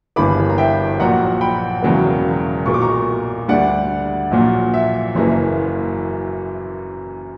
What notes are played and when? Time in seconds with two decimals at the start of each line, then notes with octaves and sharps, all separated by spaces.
0.16 G1 G2 E3 A#3 B5 D6
0.50 A#5
0.58 E5 G5
1.00 A#1 A#2 F#3 F#5 A#5
1.41 G5 B5
1.82 E1 E2 C#3 F#3 A#3
2.66 B1 A#2 A#3 C#6
2.74 D6
2.81 A#5 C#6
3.48 D2 D3 G3 D5 F#5
4.31 A#1 A#2 F#3
4.74 E5
5.15 F#1 F#2 E3 A#3